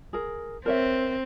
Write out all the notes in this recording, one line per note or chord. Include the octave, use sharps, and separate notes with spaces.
G#4 A#4
C4 A#4 C#5 E5